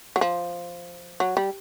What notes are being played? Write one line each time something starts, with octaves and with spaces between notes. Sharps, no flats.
F#3
F3
F#3
G3